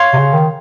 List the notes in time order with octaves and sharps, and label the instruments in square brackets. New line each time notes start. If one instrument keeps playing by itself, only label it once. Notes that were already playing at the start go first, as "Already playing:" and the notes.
Already playing: [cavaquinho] C#5 F5 C6
[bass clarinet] C3
C#3
D#3